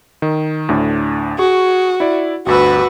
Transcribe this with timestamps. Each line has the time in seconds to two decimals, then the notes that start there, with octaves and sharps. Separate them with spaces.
0.22 D#3
0.69 D2 A2 D4
1.38 F#4 G#4 C#6
2.00 E4 D5
2.46 G1 D2 F#4 B4 E6